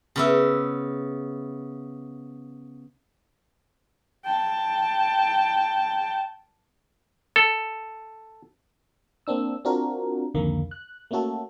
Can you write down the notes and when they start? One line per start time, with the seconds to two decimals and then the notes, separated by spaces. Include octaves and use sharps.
0.16 C#3 B3 E5
4.25 G5 A5
7.36 A4
9.27 A#3 C4 D4 E6
9.65 C4 D4 F4 F#4 A#4
10.34 C2 F2 D3 D#3 A#3
10.71 F#6
11.11 A3 A#3 C#4 F#4 A4